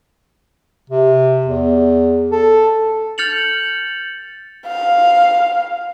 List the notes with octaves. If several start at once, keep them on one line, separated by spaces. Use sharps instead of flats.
C3
E2
A4
F6 G6 A6 C#7 F7 F#7
F5